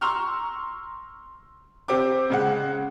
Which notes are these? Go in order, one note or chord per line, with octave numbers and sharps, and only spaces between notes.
A#5 C6 C#6 E6 F6
C4 G4 D6
C#3 G#3 F#5